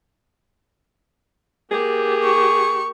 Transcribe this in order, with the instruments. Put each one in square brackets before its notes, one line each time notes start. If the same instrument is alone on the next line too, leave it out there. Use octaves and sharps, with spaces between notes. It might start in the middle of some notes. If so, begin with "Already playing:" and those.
[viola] A#3 G4 [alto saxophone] G#4
[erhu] C#6